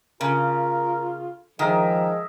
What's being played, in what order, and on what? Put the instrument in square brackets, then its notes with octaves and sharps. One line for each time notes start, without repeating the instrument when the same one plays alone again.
[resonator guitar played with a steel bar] C#3 [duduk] F4 [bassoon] A#4
[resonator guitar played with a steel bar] D#3 [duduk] F3 [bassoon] G#3 [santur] G#4 A#4 E5